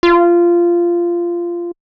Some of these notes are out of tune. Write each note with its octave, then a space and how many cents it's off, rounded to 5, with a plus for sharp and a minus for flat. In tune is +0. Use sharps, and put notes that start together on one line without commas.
F4 -15